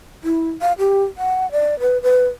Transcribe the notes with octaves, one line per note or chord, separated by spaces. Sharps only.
E4
F5
G4
F#5
D5
B4
B4